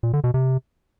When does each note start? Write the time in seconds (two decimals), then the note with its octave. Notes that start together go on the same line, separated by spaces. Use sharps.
0.03 A#2
0.13 D3
0.24 B2
0.34 C3